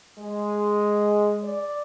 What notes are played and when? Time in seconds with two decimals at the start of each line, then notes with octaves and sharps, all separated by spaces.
0.17 G#3
1.42 D5